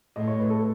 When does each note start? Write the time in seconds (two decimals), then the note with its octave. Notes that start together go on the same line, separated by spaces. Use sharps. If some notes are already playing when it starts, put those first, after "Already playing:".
0.16 A2 D#5
0.27 C#5
0.39 B4
0.50 A4